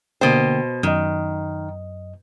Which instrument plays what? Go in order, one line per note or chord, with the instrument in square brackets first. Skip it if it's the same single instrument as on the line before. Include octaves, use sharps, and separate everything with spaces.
[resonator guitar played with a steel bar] B2 C5 [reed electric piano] D3 A#3 G5
[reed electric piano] F#2 D#5 [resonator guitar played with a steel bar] D#3